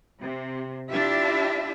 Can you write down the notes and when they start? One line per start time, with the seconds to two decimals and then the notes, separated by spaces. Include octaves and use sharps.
0.23 C3
0.90 D4 E4 F4 G4 E5